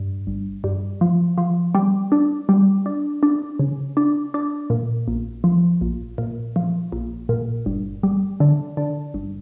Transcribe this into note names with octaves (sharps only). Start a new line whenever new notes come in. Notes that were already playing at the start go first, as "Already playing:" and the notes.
Already playing: G2
G1
G2
F3
F3
G3
D4
G3
D4
D4
C#3
D4
D4
A#2
A#1
F3
A#1
A#2
F3
A#1
A#2
G1
G3
D3
D3
G1